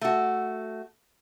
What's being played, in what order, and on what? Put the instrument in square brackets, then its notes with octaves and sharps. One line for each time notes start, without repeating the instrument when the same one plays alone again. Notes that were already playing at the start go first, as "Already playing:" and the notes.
[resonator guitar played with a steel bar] A3 F#4